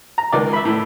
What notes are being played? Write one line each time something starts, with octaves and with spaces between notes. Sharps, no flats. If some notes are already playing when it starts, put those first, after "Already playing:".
A#5
C#2 D#3 D5
E5 B5
A2